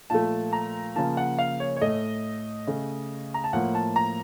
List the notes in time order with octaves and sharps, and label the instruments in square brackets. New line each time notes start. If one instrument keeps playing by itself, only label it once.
[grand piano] A#2 F3 A3 A5
A#5
C#3 F3 A#3 A5
F#5
F5
C#5
C#5
A2 A3 D#5
C#3 A3
A#5
A5
A2 F3 A#3 F#5
A5
A#5